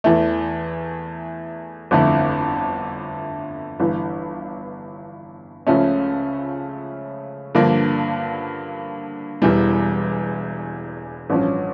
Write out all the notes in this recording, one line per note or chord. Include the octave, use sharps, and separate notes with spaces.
E2 E3 A3
G1 F2 D3 A3 E4
G1 G2 E3
C#2 C#3 F3 A3 C#4
G2 D3 F3 A#3
E1 E2 E3 G3
A1 G2 F3 C#4